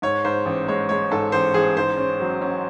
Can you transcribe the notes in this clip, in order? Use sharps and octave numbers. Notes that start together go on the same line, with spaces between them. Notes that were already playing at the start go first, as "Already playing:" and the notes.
G#2 C#5
G#2 C5
A1
G#3 C#5
G#3 C#5
G#2 A4
A1 C5
A1 G#4
G#2 C5
C#4
F#3
C#4